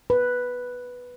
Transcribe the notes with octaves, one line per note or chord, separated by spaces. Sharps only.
B4